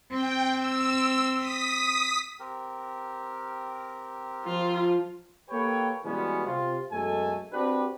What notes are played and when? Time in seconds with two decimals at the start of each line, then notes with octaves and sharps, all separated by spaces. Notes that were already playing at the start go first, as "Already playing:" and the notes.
0.11 C4 G5
0.57 E6
1.37 D#6 B6
2.39 C4 G4 A#4
4.45 F3 F4
5.50 A#3 G4 A4 B4 C#5 G5
6.04 B2 E3 G3 G#3 B3 C#4
6.46 C3 F4
6.92 F#2 B2 G#3 A3 A4 G#5
7.53 C4 D4 F#4 G4 B4